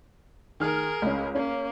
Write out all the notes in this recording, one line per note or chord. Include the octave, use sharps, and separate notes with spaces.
D#3 G#4 A#4 F6
C#2 C#4
A#3 C#4